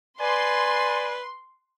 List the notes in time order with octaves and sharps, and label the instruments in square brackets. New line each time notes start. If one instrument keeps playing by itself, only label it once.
[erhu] B4 [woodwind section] D5 G#5 [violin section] C6